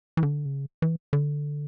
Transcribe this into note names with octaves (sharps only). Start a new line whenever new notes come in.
E3
D3
C#3
E3
D3